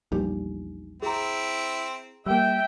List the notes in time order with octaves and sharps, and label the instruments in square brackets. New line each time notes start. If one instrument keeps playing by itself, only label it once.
[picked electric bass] A#1 E2 G3 [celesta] D#4
[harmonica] C4 E4 [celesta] G#4 A#5
[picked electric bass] G3 A#3 [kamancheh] E5 G5 [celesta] E6